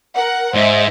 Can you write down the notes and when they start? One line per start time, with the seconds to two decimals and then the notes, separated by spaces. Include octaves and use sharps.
0.15 A#4 F#5
0.54 G#2 C5 D#5 E5